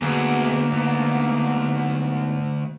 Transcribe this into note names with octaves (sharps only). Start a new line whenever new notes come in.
D2 A#3 B3 F#4 G#4
G#2 B3